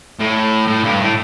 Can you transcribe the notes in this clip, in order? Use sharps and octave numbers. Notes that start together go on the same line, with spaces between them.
A2
A2
G2
A2